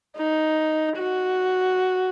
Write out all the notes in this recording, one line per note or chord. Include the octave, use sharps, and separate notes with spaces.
D#4
F#4